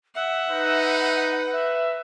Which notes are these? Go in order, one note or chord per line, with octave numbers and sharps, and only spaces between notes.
E5 F#5
D#4 B4
E5